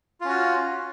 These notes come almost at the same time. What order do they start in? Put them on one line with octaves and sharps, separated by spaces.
F4 C#4 F#4